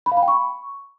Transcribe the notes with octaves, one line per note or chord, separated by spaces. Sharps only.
B5
F5
B5
G5
C#6